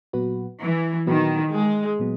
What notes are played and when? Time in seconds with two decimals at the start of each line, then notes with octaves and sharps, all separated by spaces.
0.13 A#2 F#3 B3 F#4 B4
0.60 E3
1.07 A#2 D#3 F#3 B3 F#4 B4
1.53 G#3
1.99 A#2 F#3 B3